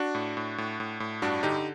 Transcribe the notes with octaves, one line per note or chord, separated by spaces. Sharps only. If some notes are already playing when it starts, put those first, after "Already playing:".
Already playing: D4 F#4
A2
A2
A2
A2
A2
G2 D4 F#4
D3 D#4 G4